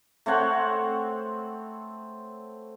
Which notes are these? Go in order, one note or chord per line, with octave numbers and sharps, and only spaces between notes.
A3 C4 C#5 F#5